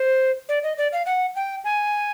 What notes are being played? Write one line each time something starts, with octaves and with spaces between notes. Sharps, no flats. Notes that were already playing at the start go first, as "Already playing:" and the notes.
Already playing: C5
D5
D#5
D5
F5
F#5
G5
G#5